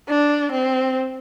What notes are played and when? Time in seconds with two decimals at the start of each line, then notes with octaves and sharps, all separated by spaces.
0.09 D4
0.52 C4